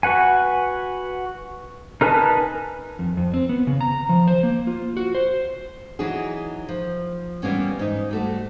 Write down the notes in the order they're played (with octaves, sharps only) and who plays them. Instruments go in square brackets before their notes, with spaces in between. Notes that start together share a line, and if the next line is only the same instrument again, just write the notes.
[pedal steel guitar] F#4 B4 F#5 G#5
D#4 A#4 B4 G#5 A5
[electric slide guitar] F2
F2
C4
B3
C#3
A#5
F3
C5
A#3
F4
F#4
C5
[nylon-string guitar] E3 F#3 D#4 F#4 G#4
F3
E3 G3 A#3 B3 C#4
G#2 D#4
G3 A3 F#4